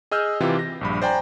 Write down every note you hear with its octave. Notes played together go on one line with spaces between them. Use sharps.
G#4 D#5 E6 F6 G6
C3 E3 F4 G4
A#6
A#1 G2 B5
C5 D5 G5 G#5 A#5